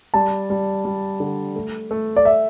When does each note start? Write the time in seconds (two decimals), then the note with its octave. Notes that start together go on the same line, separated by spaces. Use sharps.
0.14 G3 A5
0.50 G3
0.85 G3
1.20 D3
1.56 A3
1.91 A3
2.16 D5
2.25 E5